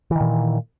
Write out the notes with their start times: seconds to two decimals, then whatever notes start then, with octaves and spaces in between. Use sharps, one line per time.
0.11 E3
0.16 D#3
0.21 A#2